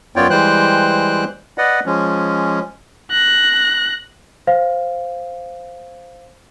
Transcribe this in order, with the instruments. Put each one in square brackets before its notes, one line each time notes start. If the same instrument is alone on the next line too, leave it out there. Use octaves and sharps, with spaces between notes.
[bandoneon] F#2 B3 F4 C#5 D5 G5
E3 G3 G#3 C5 G5 F#6
B4 D5 D#5 F#5
F3 G#3 C#4
[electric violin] F#6 A#6
[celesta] C5 F5